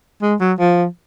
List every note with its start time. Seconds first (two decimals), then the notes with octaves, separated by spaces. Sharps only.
0.22 G#3
0.40 F#3
0.59 F3